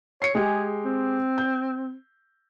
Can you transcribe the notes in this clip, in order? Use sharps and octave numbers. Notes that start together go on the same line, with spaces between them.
C#5 C7 C#7
G#3 G4 G#4
C4
G6